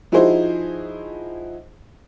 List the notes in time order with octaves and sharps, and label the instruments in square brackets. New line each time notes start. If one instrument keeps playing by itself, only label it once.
[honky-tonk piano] F3 D#4 E4 F#4 G#4 C5